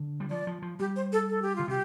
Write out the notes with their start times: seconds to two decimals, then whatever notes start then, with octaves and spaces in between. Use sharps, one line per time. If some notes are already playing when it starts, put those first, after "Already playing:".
Already playing: D3
0.20 G3
0.30 F3 D5
0.47 F3
0.62 F3
0.79 G3 G4
0.96 C5
1.12 A4
1.29 A4
1.42 G4
1.56 D3 F4
1.68 C3 G4